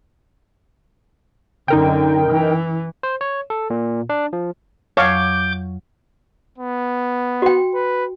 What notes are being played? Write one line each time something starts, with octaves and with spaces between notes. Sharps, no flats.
F#2 D3 D#4 A#4 G5
E3
C5
C#5
A4
A#2
D4
F3
F2 F#3 C#5 F5 D6 G6
B3
F#4 G5
B4